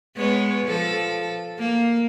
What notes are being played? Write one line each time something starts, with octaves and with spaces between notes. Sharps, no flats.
G#3 B3 C#5
F3 A4
A#3